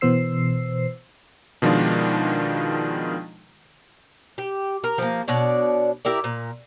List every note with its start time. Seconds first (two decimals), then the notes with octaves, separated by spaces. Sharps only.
0.01 B2 E3 B3 C5 E6 C7
1.62 B2 D#3 F3 G#3 D4 F4
4.38 G4
4.84 A#4
4.98 F3 A#3
5.28 B2 D4 C#5 D5
6.05 E4 G4 A#4 D5
6.24 A#2